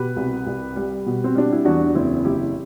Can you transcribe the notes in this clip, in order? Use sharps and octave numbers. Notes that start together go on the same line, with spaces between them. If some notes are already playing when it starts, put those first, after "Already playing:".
Already playing: B2 G4 B4
C2
C2
G3
B2
C4
G3 D4
E4
E2 D4 F#4
F#1 C4 E4
F#1 E4 G4